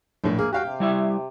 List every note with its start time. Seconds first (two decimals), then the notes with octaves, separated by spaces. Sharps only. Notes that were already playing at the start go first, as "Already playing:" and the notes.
0.24 A#1 A2
0.39 A#3 G#4
0.53 F#4 G4 F5 G5
0.65 C3
0.80 G3 E4 E5